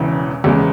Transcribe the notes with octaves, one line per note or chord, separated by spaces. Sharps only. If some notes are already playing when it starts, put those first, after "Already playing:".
Already playing: E1 E2 C#3 E3
E2 C#3 G#3